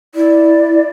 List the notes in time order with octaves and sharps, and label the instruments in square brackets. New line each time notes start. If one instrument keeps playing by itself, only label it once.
[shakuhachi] E4 [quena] D5